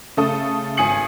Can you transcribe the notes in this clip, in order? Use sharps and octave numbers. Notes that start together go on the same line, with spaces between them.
C#3 A3 A4 D#6
G#1 G#5 D#6 C#7 F#7